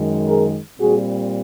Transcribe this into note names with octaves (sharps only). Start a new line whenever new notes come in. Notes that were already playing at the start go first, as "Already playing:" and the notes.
Already playing: F#2 D#3 G#3
G#4 A#4
A#2 G3 C4 F#4 G#4